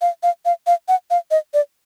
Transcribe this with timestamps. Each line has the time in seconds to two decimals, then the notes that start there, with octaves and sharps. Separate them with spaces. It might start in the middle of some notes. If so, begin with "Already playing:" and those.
0.01 F5
0.23 F5
0.45 F5
0.67 F5
0.88 F#5
1.10 F5
1.31 D#5
1.54 D5